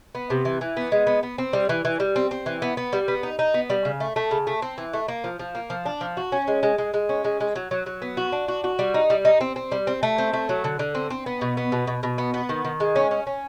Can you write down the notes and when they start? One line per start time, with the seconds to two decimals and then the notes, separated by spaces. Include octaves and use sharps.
0.15 B3
0.30 C3
0.45 E3
0.61 E3
0.77 B3
0.92 G#3
1.07 B3
1.23 B3
1.38 C4
1.53 G3
1.69 E3
1.85 E3
2.00 G3
2.16 C4
2.31 C4
2.46 E3
2.62 B3
2.77 B3
2.93 G3
3.08 B3
3.23 D#4
3.39 D#4
3.54 B3
3.70 G3
3.85 C#3
4.00 A3
4.16 A3
4.31 C#3
4.47 A3
4.62 C4
4.78 E3
4.93 A3
5.08 A#3
5.24 F3
5.39 F3
5.55 A#3
5.70 F3
5.86 D4
6.01 F3
6.17 F#4
6.32 C#4
6.48 G#3
6.63 G#3
6.78 G#3
6.94 G#3
7.09 C#4
7.25 G#3
7.40 G#3
7.55 F#3
7.71 F#3
7.86 F#3
8.02 B3
8.17 F#4
8.32 D4
8.48 F#4
8.64 F#4
8.79 G3
8.94 D#4
9.10 G3
9.25 D#4
9.41 C4
9.56 C4
9.72 G3
9.87 C4
10.03 A3
10.18 C4
10.33 A3
10.49 F#3
10.64 D3
10.79 D3
10.95 C4
11.10 C4
11.26 B3
11.41 B2
11.57 B3
11.72 B2
11.87 B2
12.03 B2
12.18 B3
12.34 B3
12.49 D#3
12.65 D#3
12.80 G#3
12.96 C#4
13.11 C#4
13.27 C#4